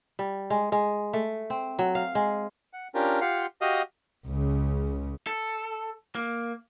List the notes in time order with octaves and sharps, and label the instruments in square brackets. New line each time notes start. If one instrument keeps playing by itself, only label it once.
[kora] G3
G#3
G#3
A3
C4
F#3
F5
G#3
[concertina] F#5
C#4 D4 F4 G4 A#4
F4 G4 F5 F#5 C6
F#4 G4 D#5 F5 D#6
[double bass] C#2 C#3
[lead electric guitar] A4
A#3